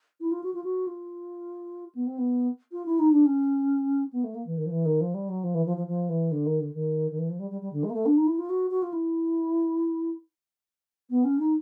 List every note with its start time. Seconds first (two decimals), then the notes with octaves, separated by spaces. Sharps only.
0.21 E4
0.32 F4
0.43 F#4
0.54 F4
0.64 F#4
0.87 F4
1.95 B3
2.07 C4
2.18 B3
2.72 F4
2.86 E4
2.99 D#4
3.12 D4
3.26 C#4
4.13 B3
4.24 A3
4.35 A#3
4.46 E3
4.57 D#3
4.66 F3
4.71 E3
4.85 D#3
5.01 F3
5.14 G3
5.29 F#3
5.44 F3
5.54 E3
5.66 F3
5.77 F3
5.88 F3
6.09 E3
6.31 D3
6.46 D#3
6.60 D3
6.74 D#3
7.11 D#3
7.18 E3
7.30 F3
7.39 G3
7.51 G3
7.61 G3
7.73 D3
7.84 G#3
7.90 A#3
7.94 A3
8.06 D4
8.17 D#4
8.27 E4
8.39 F4
8.49 F#4
8.71 F#4
8.82 F4
8.93 E4
11.10 B3
11.24 C#4
11.40 D#4